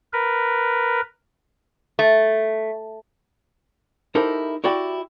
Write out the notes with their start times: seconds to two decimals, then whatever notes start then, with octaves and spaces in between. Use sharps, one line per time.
0.13 A#4 B4
1.99 A3
4.15 D#4 E4 G4 A4 A#4 C5
4.64 E4 F#4 G4 D5 G5